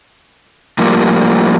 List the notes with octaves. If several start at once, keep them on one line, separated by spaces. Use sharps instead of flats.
A2 F3 G3 A#3